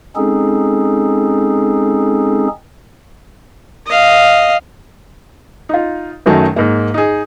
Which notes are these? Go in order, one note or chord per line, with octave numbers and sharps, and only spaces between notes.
G#3 C4 C#4 D#4 G#4 A4
D#5 F5
D#4 F4
F#2 D#3 F#3 A3 D#4
G#2 A#3
D#4 G#4